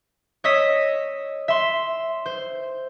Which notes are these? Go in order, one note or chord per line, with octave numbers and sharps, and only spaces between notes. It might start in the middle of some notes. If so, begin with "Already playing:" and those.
C#5 D#5 E6 B6
E5 C6
C5